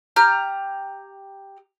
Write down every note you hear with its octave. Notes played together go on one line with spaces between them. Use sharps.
G4 A#5 F6